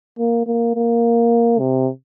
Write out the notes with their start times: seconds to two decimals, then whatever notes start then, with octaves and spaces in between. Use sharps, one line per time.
0.19 A#3
0.46 A#3
0.75 A#3
1.59 C3